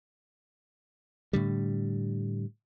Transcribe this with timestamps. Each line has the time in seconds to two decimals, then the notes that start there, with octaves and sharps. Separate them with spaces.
1.33 A2 D3 G3